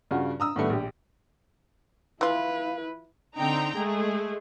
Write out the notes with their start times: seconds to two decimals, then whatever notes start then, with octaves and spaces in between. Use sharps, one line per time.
0.11 G2 C#3 F4 F#4
0.40 A#5 D#6 E6
0.56 A2 D#3 G3 A3 B3
0.69 A#1 G4
2.21 E3 E4 F4 B4 F5
3.36 D3 C4 D#4 G5 A#5
3.76 G#3 A3 G#4